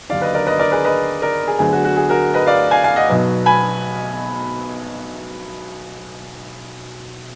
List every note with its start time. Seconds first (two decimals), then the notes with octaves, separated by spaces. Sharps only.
0.09 D#2 D3 F#3 D4 D5 F5
0.22 B4 D#5
0.34 A#4 D5
0.47 B4 D#5
0.59 A#4 D5
0.72 G#4 B4
0.85 B4 D#5
1.22 A#4 D5
1.47 G#4
1.59 D2 D3 F#3 B3 D4 G#4
1.72 F#4
1.85 F#4
1.97 G#4
2.09 F#4 A#4
2.34 B4 D#5
2.46 D5 F5
2.71 F5 G#5
2.84 F5 G#5
2.96 D#5 F#5
3.09 B1 B2 F#3 B3
3.46 G#5 B5